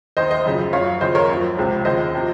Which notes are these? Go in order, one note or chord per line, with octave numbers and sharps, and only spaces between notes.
D#2 D#3 C5 D#5
C5 D#5
F#2 C#3 F3
F#2 F3 C#5 F5
D#2 C#3 F3 C5 D#5
A#4 C#5
F#2 F3
C#2 C3 F3
D#2 C#3 F3 C5 D#5
C3 F3